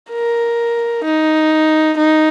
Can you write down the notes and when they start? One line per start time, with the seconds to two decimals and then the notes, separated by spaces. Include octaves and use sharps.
0.11 A#4
1.04 D#4
1.98 D#4